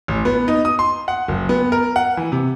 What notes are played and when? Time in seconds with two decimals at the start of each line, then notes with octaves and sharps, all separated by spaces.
0.08 A1
0.25 B3
0.48 D#4
0.65 D#6
0.79 C6
1.08 F#5
1.28 F#1
1.49 B3
1.72 A#4
1.96 F#5
2.17 E3
2.32 C3